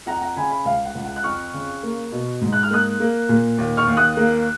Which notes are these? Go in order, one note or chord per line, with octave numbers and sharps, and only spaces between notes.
F2 F#5 A#5
F#5 A#5
C#3 G#5 B5
G#5 B5
C#2 F5
F#5
C#2
F#5
F#6
F2 C#6 F6
C#3
A#3
B2
G#2
F#6
F6
A#3 D#6 F#6
A#3
A#2
D#2
C#6 F6
D#2
D#6 F#6
A#3